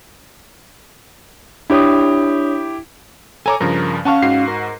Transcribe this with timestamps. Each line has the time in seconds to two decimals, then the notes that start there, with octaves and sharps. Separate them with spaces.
1.70 D4 E4 G4 C#5 D#6
3.46 A4 C#5 G#5 A#5 D6
3.61 G2 C#3 F3 A#4
4.05 C#4 F5 F#5 A5 C#6
4.22 G#2 F#4 C7
4.48 A#4